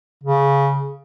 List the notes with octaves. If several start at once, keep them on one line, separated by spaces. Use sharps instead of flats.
C#3